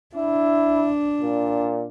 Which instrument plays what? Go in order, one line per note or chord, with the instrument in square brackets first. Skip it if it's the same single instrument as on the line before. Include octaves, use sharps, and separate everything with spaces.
[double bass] D4 [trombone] E4
[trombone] A#2